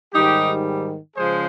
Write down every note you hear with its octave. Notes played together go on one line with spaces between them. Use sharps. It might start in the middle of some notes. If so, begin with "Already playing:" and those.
G#2 D#3 G3 D#4 G4
C#3 F3 G#3 G#4 C5